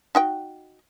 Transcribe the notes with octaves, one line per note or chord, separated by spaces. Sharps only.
D#4 F#4 G5